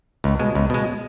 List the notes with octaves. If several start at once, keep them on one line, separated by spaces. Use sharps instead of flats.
C#2
B2 G#3
C#2
B2 G#3